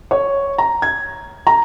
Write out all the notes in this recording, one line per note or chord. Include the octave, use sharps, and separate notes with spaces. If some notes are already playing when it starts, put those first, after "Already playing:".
C#5
A#5
G#6
A#5